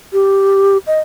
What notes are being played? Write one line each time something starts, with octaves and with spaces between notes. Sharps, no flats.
G4
D#5